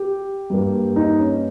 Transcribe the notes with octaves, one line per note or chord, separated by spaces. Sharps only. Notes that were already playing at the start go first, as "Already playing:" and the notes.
Already playing: G4
G2 G3 A#3
D#4
C#4